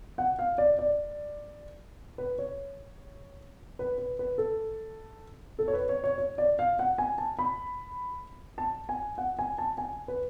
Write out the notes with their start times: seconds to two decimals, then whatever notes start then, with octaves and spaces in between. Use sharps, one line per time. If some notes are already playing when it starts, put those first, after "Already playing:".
0.18 F#5
0.39 F5
0.58 D5
0.79 D5
2.18 B4
2.38 C#5
3.79 B4
3.98 B4
4.19 B4
4.38 A4
5.59 A4
5.68 C#5
5.73 B4
5.89 C#5
6.04 C#5
6.18 C#5
6.38 D5
6.59 F5
6.79 F#5
6.98 G#5
7.18 A5
7.39 B5
8.58 A5
8.89 G#5
9.18 F#5
9.39 G#5
9.58 A5
9.78 G#5
10.08 B4